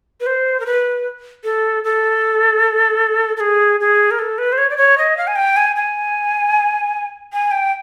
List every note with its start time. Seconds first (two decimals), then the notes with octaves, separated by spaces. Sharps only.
0.20 B4
0.26 C5
0.60 A#4
0.66 B4
1.44 A4
1.84 A4
3.37 A4
3.40 G#4
3.80 G#4
4.11 A#4
4.19 A4
4.38 B4
4.52 C5
4.58 C#5
4.70 D5
4.77 C#5
4.98 D#5
5.17 F5
5.27 G#5
5.36 G5
5.56 G#5
5.76 G#5
7.33 G#5
7.51 G5